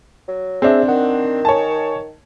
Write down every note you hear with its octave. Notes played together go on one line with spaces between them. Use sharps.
F#3
C4 D4 G#4 C5 E5
D#3 F#5
C#5 G#5 A5